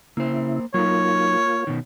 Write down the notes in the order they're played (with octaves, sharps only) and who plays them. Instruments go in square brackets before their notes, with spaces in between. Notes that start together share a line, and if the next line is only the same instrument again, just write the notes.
[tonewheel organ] C#3 E4 [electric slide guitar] A#3 C5
[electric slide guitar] F#3 D#4 [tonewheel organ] A#3 F4 [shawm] C#5
[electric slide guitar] B2 D#3